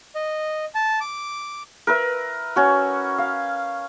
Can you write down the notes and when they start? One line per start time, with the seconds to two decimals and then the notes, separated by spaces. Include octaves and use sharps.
0.15 D#5
0.75 A5
1.01 D6
1.87 A#4 B4 E5
2.56 C#4 F#4
3.18 F5